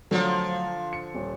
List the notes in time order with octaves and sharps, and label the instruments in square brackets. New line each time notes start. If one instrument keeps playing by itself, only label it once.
[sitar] D3 F3 [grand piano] F#3 A3
[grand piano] C#7
D#1